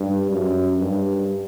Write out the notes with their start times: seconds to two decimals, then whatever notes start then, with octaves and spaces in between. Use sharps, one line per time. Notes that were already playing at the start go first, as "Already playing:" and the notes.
Already playing: G2
0.31 F#2
0.81 G2